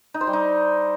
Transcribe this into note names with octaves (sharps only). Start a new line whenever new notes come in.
D#4
C5
G3
D#4